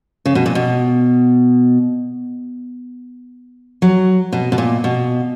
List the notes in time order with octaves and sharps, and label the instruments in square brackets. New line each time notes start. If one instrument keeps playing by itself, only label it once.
[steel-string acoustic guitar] C#3
B2
A#2
B2
F#3
B2
B2
A#2
B2